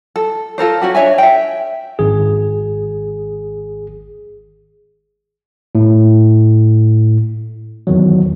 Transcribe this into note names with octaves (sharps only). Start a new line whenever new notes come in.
A4
F4 A4 A#4 C5
C#4 F#4 G4
D4 C#5 E5 G#5
E5 G5
G#1 G#4
A2
E2 D#3 F#3